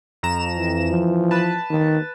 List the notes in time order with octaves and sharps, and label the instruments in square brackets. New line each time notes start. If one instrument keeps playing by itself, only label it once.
[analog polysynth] F2 A#5 E7
[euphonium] E3
[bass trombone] F3
[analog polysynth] B4 A5
[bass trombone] D#3